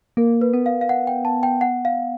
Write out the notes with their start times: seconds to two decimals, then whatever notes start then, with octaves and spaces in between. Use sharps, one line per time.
0.17 A#3 A#4
0.41 B4
0.53 B3
0.66 F5
0.81 F5
0.89 F#5
1.07 G5
1.25 A5
1.43 G5
1.61 F#5
1.85 F5